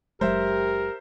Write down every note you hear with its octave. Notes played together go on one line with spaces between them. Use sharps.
F#1 F#3 G#3 G4 A#4 C5 E5